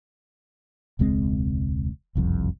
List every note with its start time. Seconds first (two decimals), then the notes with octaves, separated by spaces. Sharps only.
0.99 E1 C#2 G#3 C4
2.15 F#1 C2 F2 C3